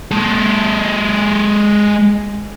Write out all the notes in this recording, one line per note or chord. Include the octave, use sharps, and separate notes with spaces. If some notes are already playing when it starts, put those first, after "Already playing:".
G#3 A4